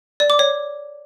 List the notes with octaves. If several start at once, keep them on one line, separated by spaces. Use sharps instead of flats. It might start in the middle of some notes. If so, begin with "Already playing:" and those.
D5
D6
C#5